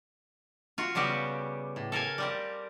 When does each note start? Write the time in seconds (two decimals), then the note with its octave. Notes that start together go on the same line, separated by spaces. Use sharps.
0.78 F4 F#4
0.95 C#3 G3 B3 F#4 G4
1.76 A2
1.92 A4 A#4 F5 G#5
2.18 G3 C4 G4